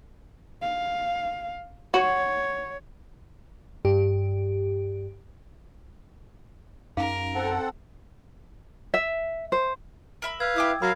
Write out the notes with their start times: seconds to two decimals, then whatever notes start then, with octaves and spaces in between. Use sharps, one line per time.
0.62 F5
1.94 F#4 C#5
3.85 G2 G4
6.97 F#2 C#4 D#4 G#4 A#4 F5
7.35 C4 A4 F#5
8.94 E5
9.52 C5
10.22 A#4 E5 B5
10.40 B4 F5 E6 G#6
10.56 E4 G5 D6 D#6
10.82 F#3 A#4 F5 B5 G#6 C7